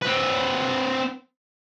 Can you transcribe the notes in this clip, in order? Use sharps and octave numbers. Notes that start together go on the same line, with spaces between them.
C4 B4